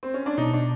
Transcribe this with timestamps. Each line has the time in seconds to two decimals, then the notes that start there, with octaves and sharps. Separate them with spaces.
0.03 C4
0.14 C#4
0.26 D4
0.38 B2 D#4
0.53 D4